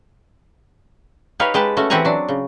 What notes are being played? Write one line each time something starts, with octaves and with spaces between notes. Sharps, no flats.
D#4 G4 B4 C#5 F5
G#3 G4 B4 G5 A5
A3 C#4 F#4
E3 C4 G4 F#5 G#5 A#5
F#3 D4
C#3